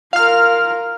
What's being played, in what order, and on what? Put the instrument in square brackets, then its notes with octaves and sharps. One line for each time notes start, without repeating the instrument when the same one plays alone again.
[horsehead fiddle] F4 A#4 [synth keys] F5 F6